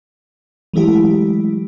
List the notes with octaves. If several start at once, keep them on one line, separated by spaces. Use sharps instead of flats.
E3 F#3 G#3 A3 E4 G4